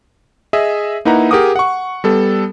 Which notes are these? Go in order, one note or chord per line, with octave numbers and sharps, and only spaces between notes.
G#4 D#5 E5
A#3 D#4 E4 B4 F#5 A#5
G4 G#4 A#4 F#5 D6 D#6
F#5 C#6
G3 B3 A4